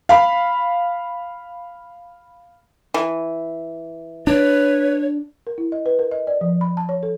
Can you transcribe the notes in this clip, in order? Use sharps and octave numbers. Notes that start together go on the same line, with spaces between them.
F5 B5
E3
D4 B4 C#5
A#4
E4
D#5
B4
A#4
D#5
D5
F3
B5
A5
C#5
A4